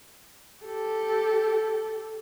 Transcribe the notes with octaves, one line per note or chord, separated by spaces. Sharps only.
G4 A4